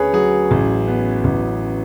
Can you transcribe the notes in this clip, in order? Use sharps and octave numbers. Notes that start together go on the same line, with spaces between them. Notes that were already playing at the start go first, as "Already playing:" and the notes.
Already playing: D2 C#3 C#4 G#4 B4 C#5
F#3 G#4
A1
B3
A1